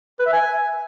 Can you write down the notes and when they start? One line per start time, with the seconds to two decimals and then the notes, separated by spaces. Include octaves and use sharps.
0.20 B4
0.26 E5
0.33 G#5